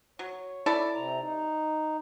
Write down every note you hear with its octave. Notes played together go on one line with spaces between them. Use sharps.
F#3 C#5
E4 A4 D5
C3 A#5
D#4